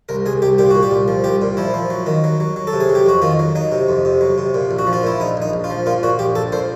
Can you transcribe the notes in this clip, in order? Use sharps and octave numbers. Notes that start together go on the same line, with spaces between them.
C2 A#4
C2 G#4
C2 G4
A#2 G4
A#2 F#4
G4
C2
F3
C2 G4
A#2
F3 E4
F3
F#3
D#3
F#3
F#3
F#3
A4
C3
G#4
F#3
G4
F2 F#4
D#3 F4
F#3
F#3 D#4
C3
F2
C3
F#3
C3
A#2
A#1
F#4
F3
F4
A#2 E4
A#1 D#4
A#1 D#4
A#1
F4
F3
A#2 F4
A#2 F#4
A#1 G4
A#1 A4
A#2 C5